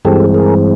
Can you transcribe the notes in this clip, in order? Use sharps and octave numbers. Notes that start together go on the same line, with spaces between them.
G2 E3 G#3 C4 G4 A4
G#4 A#4